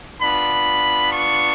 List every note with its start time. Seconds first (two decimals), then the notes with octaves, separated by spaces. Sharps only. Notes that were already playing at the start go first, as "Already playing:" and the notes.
0.20 B3 D4 F4 B5
1.11 C#6